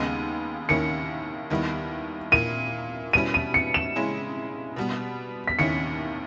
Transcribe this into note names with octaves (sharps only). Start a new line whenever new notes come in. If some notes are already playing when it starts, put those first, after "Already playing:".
Already playing: D#2 C#3 G#3 B3 D#4 D#7
D#2 D#3 A#3 C#4 E4 C#7
D#2 D#3 G3 B3 E4
A#2 A#3 E4 D#7
B2 G3 C#4 E4 D#7
D#7
C#7
E7
C#3 G#3 C#4 E4
B2 G3 B3
B6
D#2 D#3 A#3 C#4 E4 C#7